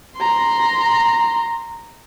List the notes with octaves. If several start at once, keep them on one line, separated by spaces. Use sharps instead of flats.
A#5 C6